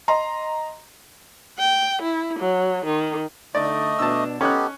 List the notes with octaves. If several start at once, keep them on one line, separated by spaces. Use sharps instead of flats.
D#5 A#5 C6
G5
E4
F#3
D#3
D3 A3 D#4 D5 D#5
B2 D4 A5 E6
B3 C#4 D#4 G4 A4 F#6